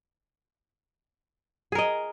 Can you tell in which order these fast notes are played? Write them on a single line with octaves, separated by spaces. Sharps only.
G#4 A#4 D#5